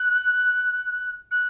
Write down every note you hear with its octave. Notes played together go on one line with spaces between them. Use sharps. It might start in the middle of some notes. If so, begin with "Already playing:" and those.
Already playing: F#6
F#6